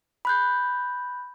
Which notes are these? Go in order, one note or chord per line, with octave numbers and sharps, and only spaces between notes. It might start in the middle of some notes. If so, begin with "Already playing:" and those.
B5 F#6 G6